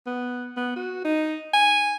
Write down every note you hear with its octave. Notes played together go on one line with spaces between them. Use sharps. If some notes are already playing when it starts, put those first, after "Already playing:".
B3
B3
F#4
D#4
G#5